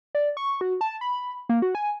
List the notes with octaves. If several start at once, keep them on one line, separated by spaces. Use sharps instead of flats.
D5
C#6
F#4
A5
B5
A#3
F#4
G#5